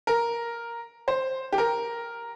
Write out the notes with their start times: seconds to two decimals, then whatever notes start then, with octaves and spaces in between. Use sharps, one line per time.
0.07 A#4
1.08 C5
1.52 G4
1.58 A#4